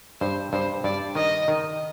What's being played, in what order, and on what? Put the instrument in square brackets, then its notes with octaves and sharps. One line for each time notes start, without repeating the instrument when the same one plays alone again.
[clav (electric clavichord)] G2 [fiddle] C5
[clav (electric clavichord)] G2 [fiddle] C5
[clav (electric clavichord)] G2 [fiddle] D5
[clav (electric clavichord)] D#3 [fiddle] D#5
[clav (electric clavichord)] D#3